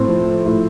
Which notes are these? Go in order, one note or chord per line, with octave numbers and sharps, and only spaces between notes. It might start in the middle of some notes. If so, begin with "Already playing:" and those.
Already playing: A2 C4
F3
A2